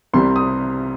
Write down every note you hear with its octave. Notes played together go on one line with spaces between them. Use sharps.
C2 C3 G3 C4 C6
D#6